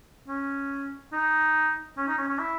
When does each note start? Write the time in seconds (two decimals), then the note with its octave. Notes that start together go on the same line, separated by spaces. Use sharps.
0.28 C#4
1.13 D#4
1.97 C#4
2.08 D#4
2.18 C#4
2.28 C#4
2.38 E4